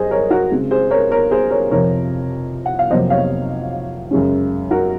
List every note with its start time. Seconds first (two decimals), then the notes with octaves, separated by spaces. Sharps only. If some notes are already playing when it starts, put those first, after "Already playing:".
Already playing: F#2 G#4 C5 D#5
0.11 A#4 C#5
0.30 F#4 A#4
0.51 C#3 G#3 C4
0.71 G#4 C5
0.91 A#4 C#5
1.11 A#4 C#5
1.31 G#4 C5
1.50 A#4 C#5
1.70 F2 C3 F3 C4 A#4 C#5
2.66 F#5
2.79 F5
2.90 F2 C3 F#3 A#3 C5 D#5
3.10 C#5 F5
4.11 F#2 C#3 G#3 C#4
4.71 F#4 A#4